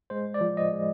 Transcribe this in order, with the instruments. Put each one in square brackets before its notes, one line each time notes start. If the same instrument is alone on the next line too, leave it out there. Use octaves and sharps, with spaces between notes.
[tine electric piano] G#3 C5
D5
F3
D#5
G#3